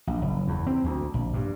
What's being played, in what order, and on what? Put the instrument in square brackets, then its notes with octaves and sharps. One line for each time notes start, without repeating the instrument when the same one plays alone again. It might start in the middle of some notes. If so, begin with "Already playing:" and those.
[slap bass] A#1
F#1
E2
C4
D2
A#1
G2